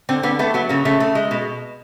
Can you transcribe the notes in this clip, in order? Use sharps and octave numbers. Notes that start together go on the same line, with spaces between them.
D3 C4
D3 B3
A3 B3
F#3 B3
C#3 A#3
C#3 A3
A3
G#3
B2